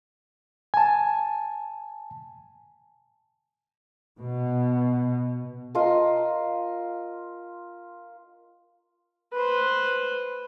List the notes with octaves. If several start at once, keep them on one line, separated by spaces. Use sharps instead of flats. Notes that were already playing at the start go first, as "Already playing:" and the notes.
G#5 A5
B2
F4 A#4 D#5 A#5
B4 C5